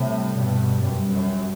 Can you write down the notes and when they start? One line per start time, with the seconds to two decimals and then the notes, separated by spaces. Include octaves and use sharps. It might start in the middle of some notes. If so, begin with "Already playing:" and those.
Already playing: A2 C3 G3 D4 G4
0.35 G2 B2
0.80 F#2 G3 D4 G4
1.09 F#2